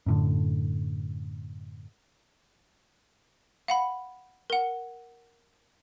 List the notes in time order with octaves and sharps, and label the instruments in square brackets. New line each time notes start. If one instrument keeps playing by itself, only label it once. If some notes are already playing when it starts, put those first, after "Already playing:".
[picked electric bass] F#2 A2 D3
[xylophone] F5 F#5 B5
A#4 F#5